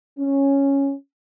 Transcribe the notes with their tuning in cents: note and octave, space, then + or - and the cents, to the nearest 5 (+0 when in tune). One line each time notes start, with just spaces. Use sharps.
C#4 -5